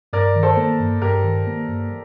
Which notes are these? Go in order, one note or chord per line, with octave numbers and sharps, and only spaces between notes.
G2 A#4 D5
D#3
A4 C5
A#3
G2
G2 G4 A#4
D#3
A#3
G2